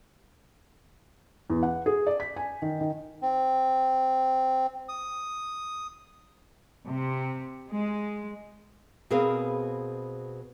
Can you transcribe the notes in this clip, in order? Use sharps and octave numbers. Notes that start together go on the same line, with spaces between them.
E2
F#5
G#4
D5
B6
G#5
D#3
D#3
C4
D#6
C3
G#3
B2 C4 G#4 A#4 B4 F5